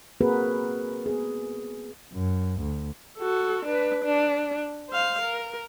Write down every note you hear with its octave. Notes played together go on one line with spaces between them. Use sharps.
A#3 C4 F#4 G#4 A#4 B4
B3 G#4
F#2
D2
F#4 A4
D4 B4
D4
C5 F5
A#4